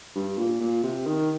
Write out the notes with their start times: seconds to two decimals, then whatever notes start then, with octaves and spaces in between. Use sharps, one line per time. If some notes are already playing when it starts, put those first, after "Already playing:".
0.15 G2
0.38 A#2
0.60 A#2
0.84 C3
1.06 D#3